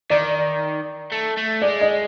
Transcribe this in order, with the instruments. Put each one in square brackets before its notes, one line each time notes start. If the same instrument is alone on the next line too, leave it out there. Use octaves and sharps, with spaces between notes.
[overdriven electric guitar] D#3 [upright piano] D5
[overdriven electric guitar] A3
A3
[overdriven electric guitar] G#3 [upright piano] D5
[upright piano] D#5